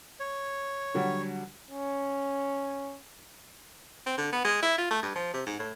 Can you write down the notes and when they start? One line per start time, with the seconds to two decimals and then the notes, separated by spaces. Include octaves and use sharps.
0.20 C#5
0.94 D3 F#3 G3
1.69 C#4
4.06 C4
4.18 D3
4.33 B3
4.44 G#3
4.63 E4
4.78 F4
4.91 A3
5.03 G2
5.15 F3
5.34 C3
5.46 G#2
5.59 A2